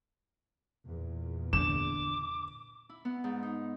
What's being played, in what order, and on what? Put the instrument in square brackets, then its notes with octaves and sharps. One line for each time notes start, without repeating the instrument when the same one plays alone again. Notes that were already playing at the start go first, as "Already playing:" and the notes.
[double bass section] E2 A#2
[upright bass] D3 [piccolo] D6 [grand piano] E7
[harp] E4
B3
G#2
D#4